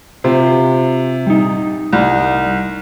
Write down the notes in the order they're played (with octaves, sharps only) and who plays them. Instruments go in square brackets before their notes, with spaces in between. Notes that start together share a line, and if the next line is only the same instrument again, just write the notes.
[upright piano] C3 [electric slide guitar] F4 G4 C5
[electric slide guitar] G3 D#4
[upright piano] C2